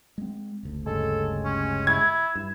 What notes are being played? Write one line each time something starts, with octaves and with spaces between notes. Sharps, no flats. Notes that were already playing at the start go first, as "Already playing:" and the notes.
G#3 C4
F#1 D2
G2 C#3 G#3 A4
C#4
E4 G#6
G2 E4